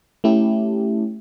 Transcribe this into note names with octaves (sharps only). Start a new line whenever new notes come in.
A3 C#4 E4 G4 A4